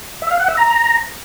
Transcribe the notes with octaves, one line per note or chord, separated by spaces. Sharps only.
E5
F5
F#5
E5
A#5